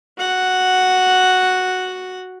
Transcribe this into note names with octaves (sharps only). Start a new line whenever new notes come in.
F#4 F#5